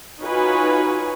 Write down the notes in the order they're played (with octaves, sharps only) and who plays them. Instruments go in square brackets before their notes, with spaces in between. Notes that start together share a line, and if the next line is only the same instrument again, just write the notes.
[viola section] D#4 F4 F#4 B4 C#5 G#5